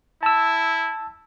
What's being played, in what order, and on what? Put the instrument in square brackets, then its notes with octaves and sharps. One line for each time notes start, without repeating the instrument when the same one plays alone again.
[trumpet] E4 [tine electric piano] A5 E6